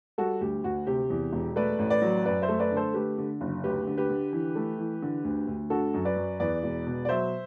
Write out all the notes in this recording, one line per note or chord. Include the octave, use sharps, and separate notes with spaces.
G3 F#4 A4
D2 G4
D2 F#4
C3 G4
E2
E1
A3 B4 D5
A1
B4 D5
F#3
F#2 B4 D5
C5 E5
A3
B4 D5
D3 A4 C5
A3 G4 B4
D3
F#1
D2 G4 B4
D3
G4 B4
D3
E3
A3
E3
D3
D2
D2
D3 F#4 A4
F#2
B4 D5
F#2
E2 B4 D5
E1
B2
D5
F#3 C5 E5